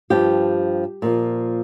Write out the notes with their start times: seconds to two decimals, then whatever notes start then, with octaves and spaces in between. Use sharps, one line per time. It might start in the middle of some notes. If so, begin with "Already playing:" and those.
0.10 G2 F3 G4
1.02 A#2 F3